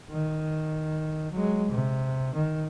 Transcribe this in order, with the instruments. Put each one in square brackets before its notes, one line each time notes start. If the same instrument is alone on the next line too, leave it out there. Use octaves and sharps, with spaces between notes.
[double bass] D#3
F#3 G#3
C3
D#3